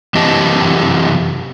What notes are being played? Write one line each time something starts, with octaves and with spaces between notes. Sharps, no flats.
F#2 C3 E3 G4 D#5 A5